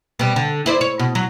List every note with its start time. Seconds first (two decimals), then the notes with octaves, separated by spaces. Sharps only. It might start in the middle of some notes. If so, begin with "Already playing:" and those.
0.19 B2 G3
0.36 D3
0.66 E4 C5 D5
0.81 C#5
0.99 B2
1.15 F#3